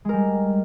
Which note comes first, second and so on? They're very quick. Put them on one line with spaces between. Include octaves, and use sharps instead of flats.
G#3 A#4 G3